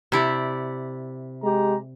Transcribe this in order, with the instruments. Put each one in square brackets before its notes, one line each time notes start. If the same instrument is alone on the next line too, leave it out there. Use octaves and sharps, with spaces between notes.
[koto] C3 E4 D5
[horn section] G#3 G4 A#5